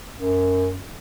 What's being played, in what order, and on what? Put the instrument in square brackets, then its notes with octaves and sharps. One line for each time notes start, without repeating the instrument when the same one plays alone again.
[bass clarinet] F#2